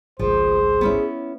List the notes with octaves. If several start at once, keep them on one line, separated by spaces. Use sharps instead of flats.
G#1 C#2 G#2 F3 G#4 C5
B3 C#4 E4